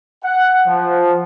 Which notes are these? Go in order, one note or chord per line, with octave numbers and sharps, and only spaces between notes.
F#5
F3